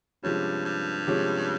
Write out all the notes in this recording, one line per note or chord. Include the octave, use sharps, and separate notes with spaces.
G2 C3 F3 G#3 C#4
G2
C3 F3 G#3 C#4